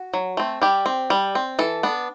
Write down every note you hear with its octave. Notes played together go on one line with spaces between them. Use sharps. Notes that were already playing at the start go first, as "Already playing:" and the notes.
Already playing: F#4
F#3
A3 C4
G3 G4
C4
G3
C4
E3 A4
B3 D4